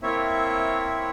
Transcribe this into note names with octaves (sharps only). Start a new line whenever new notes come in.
A#3 C4 E4 C#5 E5